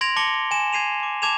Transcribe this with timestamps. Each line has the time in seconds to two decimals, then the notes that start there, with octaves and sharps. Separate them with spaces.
0.01 C6 G#6 A#6 D7 F7 F#7
0.16 A5 D6 A#6 C#7 G7
0.51 G#5 E7
0.73 G#6 C7 D#7 F7
1.03 D6
1.22 A5 D6 G#6 E7 F7